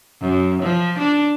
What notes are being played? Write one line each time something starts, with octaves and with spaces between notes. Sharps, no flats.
F#2
F3
D4